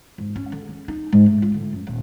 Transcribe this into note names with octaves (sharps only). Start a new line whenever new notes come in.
G#2
C#4
D3
G#3
D#4
G#2
A3
F4
D3
F#2
D#1